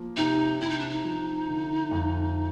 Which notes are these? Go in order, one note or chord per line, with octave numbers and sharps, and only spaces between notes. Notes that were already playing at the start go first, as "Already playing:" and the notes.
Already playing: F3 A#3
C3 D#4
C3 E4
D#4
D4
D#4
F3
D3
F2